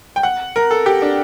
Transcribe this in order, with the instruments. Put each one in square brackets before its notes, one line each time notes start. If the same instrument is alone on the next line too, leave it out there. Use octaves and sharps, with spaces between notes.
[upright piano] G5
F#5
A#4
A4
G4
D4